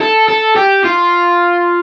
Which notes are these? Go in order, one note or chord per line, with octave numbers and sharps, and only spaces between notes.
A4
A4
G4
F4